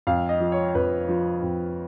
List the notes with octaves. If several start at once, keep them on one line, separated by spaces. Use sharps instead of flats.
F2 F5
D#5
F3
C#5
F2 B4
F3
F2